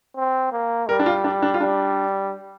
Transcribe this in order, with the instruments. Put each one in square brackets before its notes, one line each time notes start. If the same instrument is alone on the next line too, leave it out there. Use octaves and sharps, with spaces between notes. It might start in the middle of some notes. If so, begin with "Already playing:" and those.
[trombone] C4
A#3
[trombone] G3 [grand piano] A#4
[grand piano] D4
F4
D4
D4
F4
[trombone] G3 [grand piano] D4